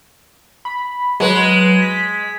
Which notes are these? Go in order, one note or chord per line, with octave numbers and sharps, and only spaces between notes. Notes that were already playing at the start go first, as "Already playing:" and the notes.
B5
F#3 G#3 B4
B6